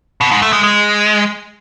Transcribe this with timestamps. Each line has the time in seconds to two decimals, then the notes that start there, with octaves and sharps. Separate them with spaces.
0.21 B2
0.31 G#2
0.42 A3
0.53 G#3
0.63 G#3